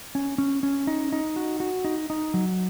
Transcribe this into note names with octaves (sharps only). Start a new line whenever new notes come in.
C#4
C#4
C#4
D#4
D#4
F#4
F#4
D#4
D#4
F#3